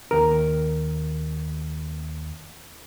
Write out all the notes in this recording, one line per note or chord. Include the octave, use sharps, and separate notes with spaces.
D#2 A#4